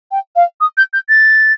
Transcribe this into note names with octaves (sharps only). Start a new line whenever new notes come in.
G5
F5
D#6
G6
G6
A6